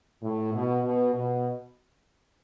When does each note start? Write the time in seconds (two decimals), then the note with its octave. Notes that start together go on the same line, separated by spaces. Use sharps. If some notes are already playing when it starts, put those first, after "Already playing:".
0.23 A2
0.53 B2
0.83 B2
1.14 B2